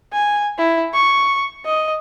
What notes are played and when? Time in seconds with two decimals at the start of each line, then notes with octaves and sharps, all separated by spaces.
0.12 G#5
0.58 E4
0.94 C#6
1.65 D#5